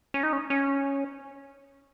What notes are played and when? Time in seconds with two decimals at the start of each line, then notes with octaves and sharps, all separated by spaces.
0.14 C#4
0.23 D#4
0.33 C#4
0.50 C#4